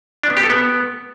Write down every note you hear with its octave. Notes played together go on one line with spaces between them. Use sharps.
D4
B3
G4
A4
B3